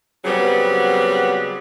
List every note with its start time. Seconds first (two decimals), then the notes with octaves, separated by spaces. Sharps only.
0.25 C#3 F#3 G3 B3 C4